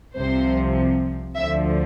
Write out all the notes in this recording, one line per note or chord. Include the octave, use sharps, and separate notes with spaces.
C2 C3 F3 C5
D2 D3 F3 E5